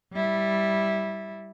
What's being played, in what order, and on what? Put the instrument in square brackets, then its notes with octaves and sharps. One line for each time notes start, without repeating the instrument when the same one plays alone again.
[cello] G3 E4